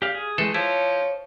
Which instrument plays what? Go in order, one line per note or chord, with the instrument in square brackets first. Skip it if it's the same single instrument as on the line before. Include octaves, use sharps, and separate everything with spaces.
[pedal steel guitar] G4 D5 F5
G#4
[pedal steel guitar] E3 G#3 [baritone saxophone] A3 [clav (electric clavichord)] A4 C5
[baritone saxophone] F3 [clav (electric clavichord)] E4 [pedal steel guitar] C#5